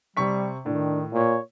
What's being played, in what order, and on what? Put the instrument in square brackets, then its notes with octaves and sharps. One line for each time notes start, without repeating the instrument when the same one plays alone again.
[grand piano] C3 C#6 B6 [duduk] G3
[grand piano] A2 [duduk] D#3 [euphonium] D4
[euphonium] A#2 [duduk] C#5